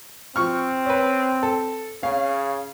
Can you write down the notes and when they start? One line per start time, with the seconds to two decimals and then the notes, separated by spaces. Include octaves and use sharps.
0.36 F3 C4 C#6 F6
0.86 C#4 B4
1.43 A4
2.03 C#3 C#5 F5